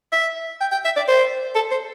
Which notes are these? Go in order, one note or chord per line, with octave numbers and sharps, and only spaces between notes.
E5
G5
G5
E5
D5
C5
A4
C5